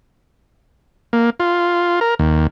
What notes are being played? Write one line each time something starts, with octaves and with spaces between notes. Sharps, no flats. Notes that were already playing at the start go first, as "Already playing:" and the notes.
A#3
F4
A#4
D#2